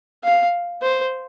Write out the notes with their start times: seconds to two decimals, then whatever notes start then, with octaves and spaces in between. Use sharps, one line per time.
0.24 F5
0.82 C5